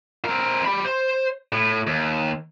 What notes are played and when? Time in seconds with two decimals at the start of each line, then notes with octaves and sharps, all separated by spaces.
0.25 C4 A#4
0.65 G4 B5
0.85 C5
1.53 A2
1.87 D#2